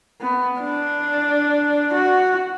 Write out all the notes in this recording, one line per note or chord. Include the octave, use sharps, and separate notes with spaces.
B3
D4
F#4